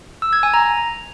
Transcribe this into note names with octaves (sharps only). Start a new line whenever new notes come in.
E6
G#6
G#5
A#5